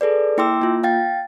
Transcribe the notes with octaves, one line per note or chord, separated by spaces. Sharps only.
G#4 A4 B4 D5
A#3 E4 G5 C6 D6 E6
A#3 F4
F5 G5 A6